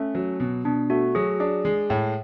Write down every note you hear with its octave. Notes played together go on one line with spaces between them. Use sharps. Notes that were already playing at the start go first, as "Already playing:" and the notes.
Already playing: A3 C#4
F#3
B2
B2 D4
A3 F#4
F#3 G#4
D4 G#4
G#3
A2